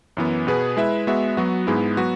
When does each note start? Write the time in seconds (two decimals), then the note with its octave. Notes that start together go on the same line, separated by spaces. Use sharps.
0.17 F#2 E3 B3
0.47 B2 B3 G#4 B4
0.77 G#3 E4 B4 E5
1.07 G#3 B3 F#4 E5
1.37 F#3 B3 F#4
1.67 G#2 G#3 B3 E4
1.97 F#3 B3 F#4 B4